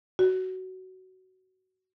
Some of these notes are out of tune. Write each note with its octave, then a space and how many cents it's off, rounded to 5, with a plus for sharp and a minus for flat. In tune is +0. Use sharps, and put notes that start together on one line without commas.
F#4 +15